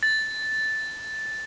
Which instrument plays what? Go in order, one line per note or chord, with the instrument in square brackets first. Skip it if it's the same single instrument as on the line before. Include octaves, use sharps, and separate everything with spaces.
[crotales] A6